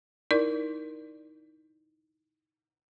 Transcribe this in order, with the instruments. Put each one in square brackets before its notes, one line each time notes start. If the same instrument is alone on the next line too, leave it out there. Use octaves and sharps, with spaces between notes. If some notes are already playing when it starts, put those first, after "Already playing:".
[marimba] D#4 E4 A#4 D5